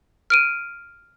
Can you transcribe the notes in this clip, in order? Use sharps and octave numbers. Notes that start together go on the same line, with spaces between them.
F6 D7 D#7